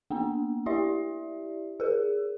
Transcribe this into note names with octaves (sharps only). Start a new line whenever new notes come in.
A#3 B3 D4
E4 G4 D5 E5
G#4 A#4